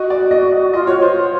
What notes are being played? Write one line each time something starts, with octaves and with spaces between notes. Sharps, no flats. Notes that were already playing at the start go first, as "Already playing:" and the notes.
Already playing: F#4 D#5
D5
D#5
D#5
F4 D#5
F#4 C#5
F4 C5